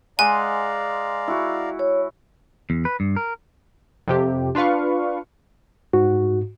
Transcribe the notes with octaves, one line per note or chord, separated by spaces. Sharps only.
G#3 D5 F5 F#5 G#5 A#5 C6
E4 F#4
C#5
E2
B4
G2
A#4
F2 C3 G4
D4 F4 B4 F5 C#6
G#2 F#4